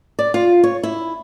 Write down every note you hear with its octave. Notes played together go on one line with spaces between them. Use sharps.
D5
F4
C#5
E4